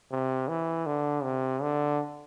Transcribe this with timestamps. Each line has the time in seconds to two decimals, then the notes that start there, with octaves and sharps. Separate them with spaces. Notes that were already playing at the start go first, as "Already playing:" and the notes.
0.12 C3
0.48 E3
0.86 D3
1.24 C3
1.62 D3